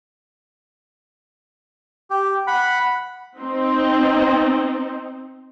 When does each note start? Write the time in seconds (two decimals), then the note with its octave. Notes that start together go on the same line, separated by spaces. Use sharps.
2.10 G4
2.47 F#5 B5
3.39 C4 D#4